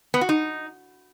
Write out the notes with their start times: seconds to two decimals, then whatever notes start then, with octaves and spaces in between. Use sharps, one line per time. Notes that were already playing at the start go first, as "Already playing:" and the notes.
0.14 B3
0.21 F#4
0.29 D#4